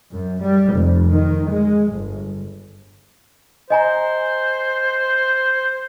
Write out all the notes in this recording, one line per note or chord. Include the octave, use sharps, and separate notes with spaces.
F#2
G3
F1
D#3
G#3
G1
C5 D#5 G#5 A#5